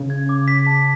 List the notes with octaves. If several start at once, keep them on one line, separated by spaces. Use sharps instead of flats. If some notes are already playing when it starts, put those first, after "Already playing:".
Already playing: C#3
G#6
D6
B6
A5